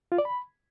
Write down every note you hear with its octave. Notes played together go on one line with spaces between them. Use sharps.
F4
D5
B5